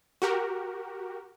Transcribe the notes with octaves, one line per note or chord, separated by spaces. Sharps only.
F#4 G4 A#4